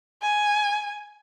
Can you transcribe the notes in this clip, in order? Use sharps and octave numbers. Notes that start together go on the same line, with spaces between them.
G#5